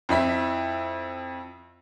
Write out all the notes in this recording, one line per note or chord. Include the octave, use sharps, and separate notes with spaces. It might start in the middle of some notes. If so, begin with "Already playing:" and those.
F2 E4 E5 B6